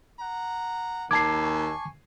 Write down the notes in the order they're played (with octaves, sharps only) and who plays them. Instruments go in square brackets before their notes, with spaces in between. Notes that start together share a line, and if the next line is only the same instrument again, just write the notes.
[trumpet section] F#5 A#5
[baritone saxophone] D#2 [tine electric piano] A5 D6 [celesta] G#6 C7
[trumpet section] G#5 C#6